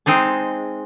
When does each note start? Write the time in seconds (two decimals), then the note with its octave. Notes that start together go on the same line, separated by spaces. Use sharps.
0.06 G#3 C4 D#4 G#4 A5